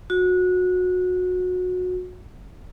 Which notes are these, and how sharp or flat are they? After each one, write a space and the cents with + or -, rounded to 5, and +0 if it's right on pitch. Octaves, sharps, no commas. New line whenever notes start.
F#4 -25